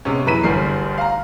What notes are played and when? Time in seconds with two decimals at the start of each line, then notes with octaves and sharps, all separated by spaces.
0.05 C3 G#3 B3 C#4
0.26 F#2 E3 B4 A#5 B6 D#7
0.43 G1 D2 G3 A#4 C7
0.98 F5 A#5